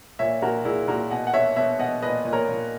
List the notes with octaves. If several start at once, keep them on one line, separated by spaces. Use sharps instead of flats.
A#2 C#5 E5
A#2 F#4 A#4
A#2 E4 G#4
A#2 F#4 A#4
B2 D#5 F#5
F#5
B2 C#5 E5
B2 C#5 E5
B2 D#5 F#5
A#2 B4 D#5
A#2
A#4 C#5
A#2